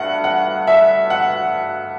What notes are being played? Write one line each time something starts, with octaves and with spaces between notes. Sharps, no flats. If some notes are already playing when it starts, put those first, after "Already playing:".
Already playing: G2 A3 F#5
F#5
E5
F#5